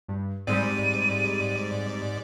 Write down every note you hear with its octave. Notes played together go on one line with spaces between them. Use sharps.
G2
G#2 G3 G#3 C4 D5 D#7